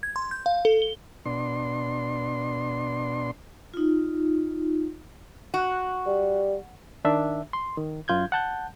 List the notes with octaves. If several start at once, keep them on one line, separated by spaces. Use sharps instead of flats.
G#6
C6
G6
F5
A4
G7
B2 D4 C6
D#4 F4
F#4
G3
D#3 D4 E5
C6
D#3
F#2 F4 G6 G#6
F#5 A5 G6